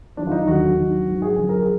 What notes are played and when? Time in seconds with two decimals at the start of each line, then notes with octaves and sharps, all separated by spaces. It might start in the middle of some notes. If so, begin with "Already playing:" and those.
0.16 F2 D#3 F#3 D4
0.27 F4
0.31 D#4
0.46 D#2 D3 F#3 F#4
0.77 D#2 D#3 F#3
1.08 G#2 F#3
1.22 G#4
1.37 F#2 D3 F3 G#4
1.49 A#4
1.62 G#4